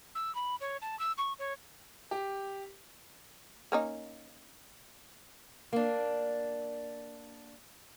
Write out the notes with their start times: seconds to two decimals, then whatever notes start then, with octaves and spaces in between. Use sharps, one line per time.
0.15 E6
0.35 B5
0.61 C#5
0.82 A5
0.99 E6
1.18 C#6
1.39 C#5
2.11 G4
3.72 A#3 C#4 D#4
5.73 A#3 D4